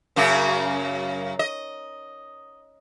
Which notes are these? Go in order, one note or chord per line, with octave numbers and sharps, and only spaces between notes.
F#2 C#3 A#3
D#5